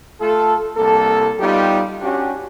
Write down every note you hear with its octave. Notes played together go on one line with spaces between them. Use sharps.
A3 F4 A4
C2 A#3 A4
G3 B3 D#4 F4 G4
C#4 D4 F#4 G4